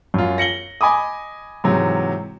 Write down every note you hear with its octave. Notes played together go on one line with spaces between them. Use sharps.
F#2 F4
A#6 C#7 F#7 G7
D#5 G#5 B5 D6 D#6
G#2 C3 E3 F#3